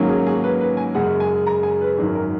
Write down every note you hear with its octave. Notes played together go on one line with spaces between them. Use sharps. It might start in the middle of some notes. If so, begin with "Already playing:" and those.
Already playing: G#2 D#3 F#3 A#3 C#4
G#4
G#4
B4
B4
G#5
F#2 C#3 G#3 F#5
G#5
A#5
G#5
B4
G#1 F#2 D#3
A#4